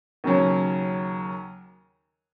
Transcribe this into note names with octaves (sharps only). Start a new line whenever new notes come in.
D#2 C#3 F#3 C#4